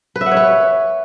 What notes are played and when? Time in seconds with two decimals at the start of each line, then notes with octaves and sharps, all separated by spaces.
0.16 B4
0.21 E5
0.26 F#5
0.31 C#5
0.37 B4